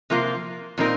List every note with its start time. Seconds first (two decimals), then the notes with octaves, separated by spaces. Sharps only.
0.10 C3 F3 A#3 F4 A#4
0.78 A#2 F3 C4 D#4 A#4